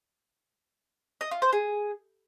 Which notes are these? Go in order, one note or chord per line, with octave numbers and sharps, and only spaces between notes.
D#5
F4
C5
G#4